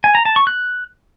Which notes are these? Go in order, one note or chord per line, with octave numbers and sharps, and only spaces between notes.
G#5
A#5
A5
C#6
F#6